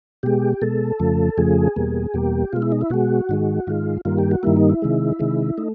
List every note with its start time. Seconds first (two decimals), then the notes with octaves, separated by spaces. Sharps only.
0.23 B2 G#3 G4
0.62 B2 G#3 A4
0.99 F2 C#3 F3 A3
1.37 F2 C#3 F3 A3 G#4
1.76 E2 B2 G3 A#3
2.14 E2 B2 G3 A#3 G4
2.53 B2 G#3 F4
2.62 E4
2.72 D#4
2.81 E4
2.90 B2 G#3 F#4
3.29 G#2 D#3 G#3
3.67 G#2 D#3 G#3 F4
4.05 G2 D#3 G3 A#3 F4
4.18 G4
4.31 F#4
4.43 G2 D#3 G3 A#3 E4
4.57 D#4
4.69 E4
4.82 C3 D#3 G#3
5.19 C3 D#3 G#3
5.58 A3 D#4